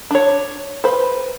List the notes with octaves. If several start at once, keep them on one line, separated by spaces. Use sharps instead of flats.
D4 C#5
B4 C5